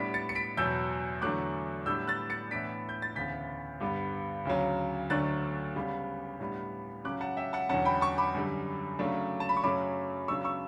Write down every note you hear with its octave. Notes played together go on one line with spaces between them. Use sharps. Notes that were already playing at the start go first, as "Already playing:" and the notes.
Already playing: A2 G3 B3 D4 B6 D7
A6 C#7
C#7
B6 D7
E2 B2 F#3 E6 G6
E2 D3 F#3 A3 D6 F#6
A2 G3 B3 D4 E6 G6
F#6 A6
A6 C#7
A2 E3 B3 D4 B6 D7
G6
A6
D2 C#3 E3 B3 G6 B6
G2 D3 G3 B3 D4
D2 C#3 F#3
D2 D3 F#3 A3 D4 F#6 A6
C#3 G3 B3
A2 G3 B3 D4
C#3 F#3 C#4 D6 F#6
F#5 A5
E5 G5
F#5 A5
E2 D3 F#3 C#4 F#5 A5
G5 B5
A5 C#6
B5 D6
F#2 D3 G3
C#3 F#3 A3 D4
A5
B5
C#6
F#2 C#3 F#3 A3 C#4 B5 D6
C#3 F#3 B3 D4 C#6 E6
C#6 E6